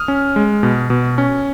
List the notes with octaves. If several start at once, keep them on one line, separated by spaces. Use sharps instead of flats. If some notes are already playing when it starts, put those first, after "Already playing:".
Already playing: D#6 F6
C#4
G#3
B2
B2
C#4